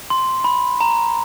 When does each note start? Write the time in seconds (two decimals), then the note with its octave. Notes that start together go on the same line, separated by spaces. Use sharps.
0.10 C6
0.44 B5
0.81 A#5